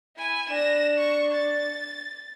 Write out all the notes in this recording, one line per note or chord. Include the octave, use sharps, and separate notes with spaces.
E4 G#5
D4 A#6 E7
C#6
A6